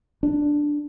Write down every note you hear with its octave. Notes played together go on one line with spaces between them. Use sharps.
D4